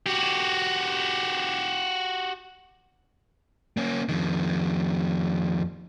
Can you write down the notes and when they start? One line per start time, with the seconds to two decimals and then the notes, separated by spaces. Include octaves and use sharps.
0.06 F#4 G4
3.77 A#3 C#4
4.09 F2 D#3